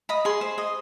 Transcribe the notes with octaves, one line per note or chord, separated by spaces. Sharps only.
D#5 B5
G#4 C6
C5
D#5